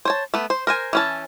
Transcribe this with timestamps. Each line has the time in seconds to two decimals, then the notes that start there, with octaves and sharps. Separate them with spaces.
0.05 C5 C#5 A5
0.34 A3 B3
0.50 C5
0.67 A#4 C5 G#5
0.93 E3 C#4 A5